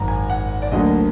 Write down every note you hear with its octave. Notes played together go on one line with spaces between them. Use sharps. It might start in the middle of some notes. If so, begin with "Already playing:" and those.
Already playing: G#1 F#2 A#5
G#5
F#5
D5
D2 D3 F#3 A#3 D#5